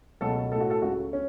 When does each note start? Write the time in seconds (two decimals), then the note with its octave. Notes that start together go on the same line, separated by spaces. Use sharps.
0.21 C#2 B2 F#3 A3 A4
0.51 A2 A3 A4
0.60 F#4
0.70 A4
0.82 C#2 C#3 A3 F#4
1.13 C#4